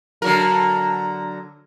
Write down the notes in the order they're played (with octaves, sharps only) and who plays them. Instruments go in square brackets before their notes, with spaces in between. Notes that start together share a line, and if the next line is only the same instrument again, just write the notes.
[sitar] D3 F#3 A#4